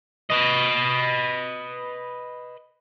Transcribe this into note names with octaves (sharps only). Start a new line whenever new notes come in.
B4 D#5